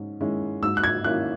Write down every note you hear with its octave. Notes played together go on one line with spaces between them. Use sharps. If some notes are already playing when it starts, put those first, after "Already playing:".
Already playing: G#2 D#3 C#4
D#3 G#3 C#4 E4
G#2 E6
F#6
G#6
D#3 A#3 C#4 E4 F#6